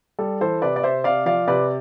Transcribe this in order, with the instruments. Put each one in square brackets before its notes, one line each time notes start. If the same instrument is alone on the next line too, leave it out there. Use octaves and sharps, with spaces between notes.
[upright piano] G3 A4
E3 A4 C5
C3 B4 D5
D5
C3 C5 E5
C3 D5 F5
F3 D5 F5
C3 B4 D5